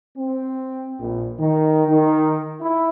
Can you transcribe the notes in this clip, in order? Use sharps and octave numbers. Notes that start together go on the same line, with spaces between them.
C4
A#1
D#3
D#3
E4